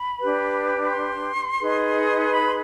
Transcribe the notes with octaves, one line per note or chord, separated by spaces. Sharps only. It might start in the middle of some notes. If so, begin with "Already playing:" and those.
Already playing: B5
D4 G4 B4
C6
D#4 G#4 B4
B5
C6